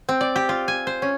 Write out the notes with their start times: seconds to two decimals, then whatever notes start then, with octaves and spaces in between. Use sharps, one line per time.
0.09 C4
0.21 D5
0.36 G4
0.49 F4
0.68 G#5
0.87 C5
1.02 C#4